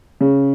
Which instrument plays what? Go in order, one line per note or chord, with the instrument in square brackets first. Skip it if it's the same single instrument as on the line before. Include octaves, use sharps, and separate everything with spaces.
[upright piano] C#3